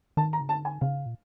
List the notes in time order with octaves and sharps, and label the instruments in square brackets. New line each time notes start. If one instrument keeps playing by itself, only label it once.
[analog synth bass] D#3 [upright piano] A5
[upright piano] A#5
[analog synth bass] C#3
[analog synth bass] D3 [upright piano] A5
[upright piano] G#5
[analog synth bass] C#3 [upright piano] F5
[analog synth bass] A#2